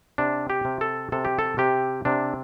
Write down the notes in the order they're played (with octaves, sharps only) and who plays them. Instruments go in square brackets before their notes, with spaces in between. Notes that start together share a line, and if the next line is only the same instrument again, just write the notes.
[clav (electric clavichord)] C3 D4
G4
C3
A4
C3 A4
G4
A4
C3 G4
C3 D4